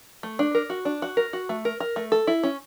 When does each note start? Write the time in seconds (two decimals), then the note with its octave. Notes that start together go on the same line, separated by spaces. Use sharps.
0.23 A3
0.39 D4
0.55 A#4
0.70 F#4
0.85 D4
1.02 F#4
1.17 A#4
1.33 F#4
1.49 A3
1.65 A#4
1.80 A#4
1.96 A3
2.12 A4
2.27 E4
2.43 C#4